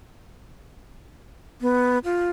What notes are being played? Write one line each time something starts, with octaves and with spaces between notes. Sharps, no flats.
B3
F4